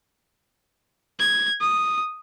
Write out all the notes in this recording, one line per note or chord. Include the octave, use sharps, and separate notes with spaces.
G#6
D#6